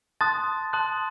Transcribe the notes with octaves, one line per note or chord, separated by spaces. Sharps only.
A5 C6 D#6 F#6 A6
A5 C6 D#6 F#6